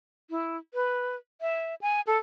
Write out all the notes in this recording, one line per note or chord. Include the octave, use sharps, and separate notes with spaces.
E4
B4
E5
G#5
A4